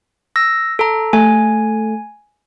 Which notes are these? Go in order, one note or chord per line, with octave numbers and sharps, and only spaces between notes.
E6 A#6
A4 A#5
A3 G#5